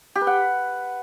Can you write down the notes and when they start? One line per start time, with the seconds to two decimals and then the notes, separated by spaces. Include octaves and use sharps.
0.15 G4
0.21 B4
0.27 F#5